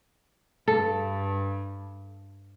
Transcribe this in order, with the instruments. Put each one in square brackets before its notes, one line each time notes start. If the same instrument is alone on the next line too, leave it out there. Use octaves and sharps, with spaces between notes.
[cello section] G2 [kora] A4